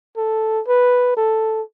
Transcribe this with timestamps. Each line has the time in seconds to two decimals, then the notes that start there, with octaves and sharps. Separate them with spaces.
0.17 A4
0.68 B4
1.17 A4